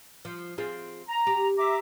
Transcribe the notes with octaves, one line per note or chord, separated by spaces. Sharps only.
F3
C4 F4 G#4
A#5
G4
E5 A#5 D6